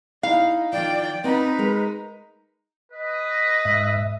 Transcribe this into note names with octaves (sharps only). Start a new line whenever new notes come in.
D#4 E4 F5
D#3 F3 D5 G5
C4 D#4 B4 D5 F#5
G#3 A#4
B4 D#5
G#2 E5